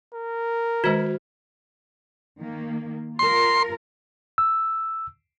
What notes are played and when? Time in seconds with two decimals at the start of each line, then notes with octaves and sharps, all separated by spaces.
0.13 A#4
0.84 D#3 G#3 F#4 C5
2.41 D#3 A#3
3.19 F4 A#4 C6
4.38 E6